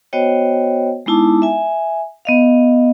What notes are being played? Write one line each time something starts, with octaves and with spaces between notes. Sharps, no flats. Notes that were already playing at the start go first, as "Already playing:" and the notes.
B3 F#4 C5 C#5 D#5 G5
G#3 B3 D#4 E4 A5 D6
E5 G#5
B3 D#5 F5